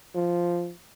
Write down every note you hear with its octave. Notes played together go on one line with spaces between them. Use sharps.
F3